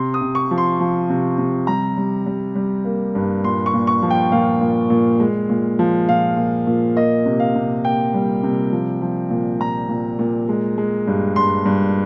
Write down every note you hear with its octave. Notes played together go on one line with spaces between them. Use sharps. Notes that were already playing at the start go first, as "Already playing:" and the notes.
Already playing: C3 C6
D#6
C3
C#6
F3
C6
F3
C3
C3
G3 A#5
G3
G3
G3
A#3
G2
A#2 C6
C#6
A#2
C#6
F3
G5
A#2 F5
A#2
A#2
G#3
A#2
F3
A#2 F5
A#2
A#2
A#3 D#5
C3
F5
C3
A#3 G5
G3
C3
F3
F3
A#2
A#2 A#5
A#2
A#2
G#3
G#3
G2
G2 C6
G2